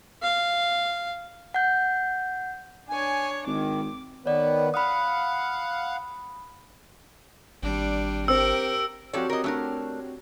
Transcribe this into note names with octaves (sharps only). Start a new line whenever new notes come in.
F5
F#5 G6
D4 C#5 G#5
G#1 D#3 D6
D#3 B3 B4 C#5 D5
F5 F#5 B5 D#6
G#1 G3 D4
C4 G4 A#4 E6
F3 C4 F#4 G4 A4 C#5 D5
A#4 D#5
A3 D4 A#4